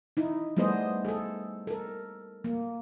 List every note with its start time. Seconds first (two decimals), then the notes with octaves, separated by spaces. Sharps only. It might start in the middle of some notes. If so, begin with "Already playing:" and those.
0.17 D#4 E4
0.57 G3 A3 B3 G#4 C5 D#5
1.05 G#4 A4
1.67 A4 A#4
2.44 A#3